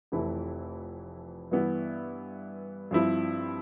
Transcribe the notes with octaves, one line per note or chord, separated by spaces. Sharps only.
F1 F2 E3 A3 E4
G2 E3 B3 E4
G2 F3 C4 E4